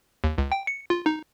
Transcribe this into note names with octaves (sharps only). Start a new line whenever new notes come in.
D#2
C#2
G5
C#7
F4
D#4